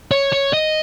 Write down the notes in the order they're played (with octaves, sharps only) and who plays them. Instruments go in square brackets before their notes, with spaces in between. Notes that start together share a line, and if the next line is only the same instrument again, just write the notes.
[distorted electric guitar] C#5
C#5
D#5